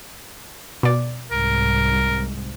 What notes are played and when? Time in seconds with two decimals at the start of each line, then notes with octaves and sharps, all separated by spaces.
0.83 B2 D5
1.31 C2 G#2 A#4